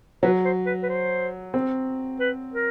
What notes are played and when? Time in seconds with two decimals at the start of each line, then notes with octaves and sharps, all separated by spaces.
0.23 F#3 B4
0.45 C5
0.66 B4
0.83 B4
0.89 C5
1.54 C4
2.20 B4
2.53 A#4